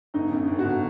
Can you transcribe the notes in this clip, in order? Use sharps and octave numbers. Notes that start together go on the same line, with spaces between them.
G1 D#4
F#2
G1
F#4
G1